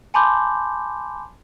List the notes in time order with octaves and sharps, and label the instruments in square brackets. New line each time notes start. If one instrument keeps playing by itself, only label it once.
[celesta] G#5 A5 B5 C6 D6 G6